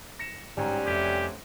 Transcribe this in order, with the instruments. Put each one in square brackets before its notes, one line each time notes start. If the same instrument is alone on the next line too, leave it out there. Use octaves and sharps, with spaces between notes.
[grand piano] A#6 C#7 E7
[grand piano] G#2 G5 A#5 [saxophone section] F#3 C4 C#4 [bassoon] G3
[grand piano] F1 E5 [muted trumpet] G4